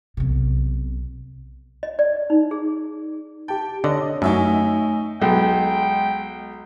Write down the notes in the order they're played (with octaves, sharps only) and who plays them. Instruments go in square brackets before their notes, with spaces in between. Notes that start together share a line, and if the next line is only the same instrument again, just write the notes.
[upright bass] B1 C3
[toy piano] D#5
D5
D#4
G#4
[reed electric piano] G4 A5 [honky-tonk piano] G5
[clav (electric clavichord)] D3 [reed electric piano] C#5 [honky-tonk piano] D#5
[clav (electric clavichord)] F#2 [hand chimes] A3 G#5 [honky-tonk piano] D#4 E5 C#6
[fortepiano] B1 [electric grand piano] G#3 [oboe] G5